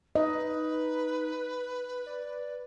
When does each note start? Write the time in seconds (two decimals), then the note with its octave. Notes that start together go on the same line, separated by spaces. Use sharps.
0.15 D#4 B4 D#5
2.06 D5